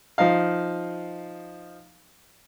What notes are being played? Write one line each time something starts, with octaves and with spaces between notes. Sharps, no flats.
F3 D#4 D#5 F5